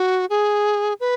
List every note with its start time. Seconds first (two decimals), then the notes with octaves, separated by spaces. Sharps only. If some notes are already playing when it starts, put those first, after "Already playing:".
Already playing: F#4
0.30 G#4
1.00 B4